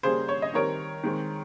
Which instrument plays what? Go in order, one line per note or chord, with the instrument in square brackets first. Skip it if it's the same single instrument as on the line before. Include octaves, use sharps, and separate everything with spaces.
[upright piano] C#3 G3 A#3 G#4 C5
C#5
D#5
D#3 G3 C4 A#4 C#5
D#3 G#3 C4